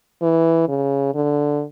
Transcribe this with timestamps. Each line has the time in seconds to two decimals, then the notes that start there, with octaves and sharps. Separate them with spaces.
0.22 E3
0.68 C#3
1.15 D3